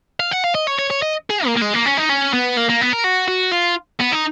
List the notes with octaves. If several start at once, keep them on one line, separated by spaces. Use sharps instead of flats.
F5
F#5
F5
D#5
C#5
C#5
C#5
D#5
G#4
A#3
A#3
G#3
A#3
C#4
D#4
C#4
B3
A#3
A#3
B3
A#4
F#4
F#4
F4
B3
D#4